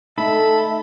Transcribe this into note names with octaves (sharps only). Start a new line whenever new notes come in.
A3 D#4 A4 E5 B5